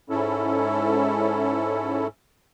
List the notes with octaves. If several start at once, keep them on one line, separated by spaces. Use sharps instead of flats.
G#2 C#4 E4 A4